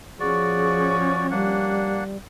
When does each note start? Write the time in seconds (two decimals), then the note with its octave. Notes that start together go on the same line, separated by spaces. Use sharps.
0.20 F3 C#4 F#4 G#4 D5
1.31 G3 A#3 D4 F#5